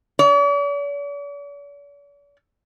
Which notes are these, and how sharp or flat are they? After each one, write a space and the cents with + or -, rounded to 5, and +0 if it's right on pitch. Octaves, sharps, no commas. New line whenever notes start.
D5 -45